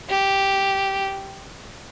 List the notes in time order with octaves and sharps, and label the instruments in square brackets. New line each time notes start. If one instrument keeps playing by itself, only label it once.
[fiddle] G4